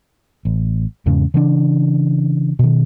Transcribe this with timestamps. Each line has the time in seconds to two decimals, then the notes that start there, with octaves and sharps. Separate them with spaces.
0.45 A1
1.06 E2 G#2 C#3
1.34 C#3 E3 D4
2.59 B2 D#3